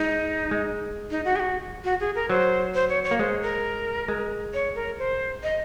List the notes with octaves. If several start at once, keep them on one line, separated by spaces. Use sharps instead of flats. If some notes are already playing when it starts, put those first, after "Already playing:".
Already playing: G#3 D#4
G#3
D#4
F#4
G#4
F#4
F#4
G#4
A#4
F#3 C5
C5
C#5
C#5
A#3
G#3 C5
A#4
G#3
C#5
A#4
C5
D#5